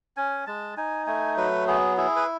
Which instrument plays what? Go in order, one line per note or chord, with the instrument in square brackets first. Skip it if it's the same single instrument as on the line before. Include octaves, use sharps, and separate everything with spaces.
[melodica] C#4 G#5
G#3 A5
D#4 G#5
A3 G#5
F#3 B4
B3 G#4
E4 G#4
B4